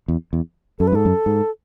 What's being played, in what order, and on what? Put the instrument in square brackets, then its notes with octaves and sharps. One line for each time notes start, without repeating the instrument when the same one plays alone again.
[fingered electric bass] E2
E2
[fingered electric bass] F#2 [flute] A4
[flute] B4
[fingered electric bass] G#2 [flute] A4
[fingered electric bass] F#2
G#2